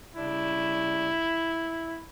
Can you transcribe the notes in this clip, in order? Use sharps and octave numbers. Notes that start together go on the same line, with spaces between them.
C#3 G3 D4 E4